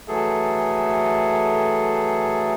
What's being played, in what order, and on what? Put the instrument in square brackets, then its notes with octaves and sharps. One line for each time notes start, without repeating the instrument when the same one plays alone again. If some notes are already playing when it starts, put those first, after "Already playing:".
[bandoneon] E3 F#3 A3 G#4 A4